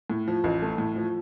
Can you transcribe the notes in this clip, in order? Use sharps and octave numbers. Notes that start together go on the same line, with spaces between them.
A2
F3
A1
A3
A2
F3